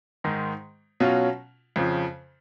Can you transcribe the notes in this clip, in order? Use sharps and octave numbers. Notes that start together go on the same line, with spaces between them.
G#2 D#3 G#3
B2 F#3 C#4 F4
F2 C#3 F3